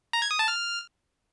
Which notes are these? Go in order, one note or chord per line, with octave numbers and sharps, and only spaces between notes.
A#5
G#6
D#6
A5
F6